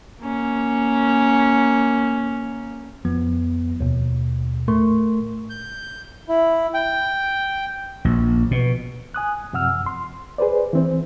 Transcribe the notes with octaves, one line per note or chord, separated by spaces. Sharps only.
A#3 C#4
F2 F3 B3
D#2 B2
A2 A3 A#4 C6 C#6
G6
E4
G5
A#1
B2
G#5 D#6 F#6
F#2 C3 F3 F#5 E6 F6
C6
G#4 B4 C5 D5
E3 C4 C5